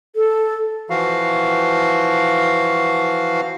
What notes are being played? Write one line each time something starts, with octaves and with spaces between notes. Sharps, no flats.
A4
E3 F3 F#4 F5